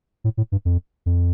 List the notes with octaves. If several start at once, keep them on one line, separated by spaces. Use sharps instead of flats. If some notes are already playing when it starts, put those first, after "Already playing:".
A2
A2
G2
F2
F2